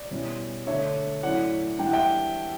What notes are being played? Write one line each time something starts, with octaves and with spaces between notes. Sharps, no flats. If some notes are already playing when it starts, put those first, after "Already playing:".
Already playing: D5
B2 G3 C#4 E4
D3 A3 D4 C#5 E5
A2 F#3 C#4 E4 D5 F#5
E3 G3 D4 G5
F#5
E5 G5